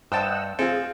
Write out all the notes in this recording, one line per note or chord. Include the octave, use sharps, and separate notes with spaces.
G2 C5 D#5 F#5 G5 A5 E6
C4 F4 G#4 A4